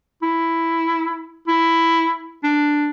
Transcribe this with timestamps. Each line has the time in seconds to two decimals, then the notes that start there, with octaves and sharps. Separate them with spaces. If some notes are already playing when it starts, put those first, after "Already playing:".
0.22 E4
1.47 E4
2.44 D4